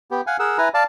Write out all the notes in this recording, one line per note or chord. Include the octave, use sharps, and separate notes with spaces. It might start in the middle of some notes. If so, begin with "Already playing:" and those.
B3 G4
F5 F#5 G#5
G#4 A#4 F#5 E6
E4 B4 G#5 A#5
D5 F5 A5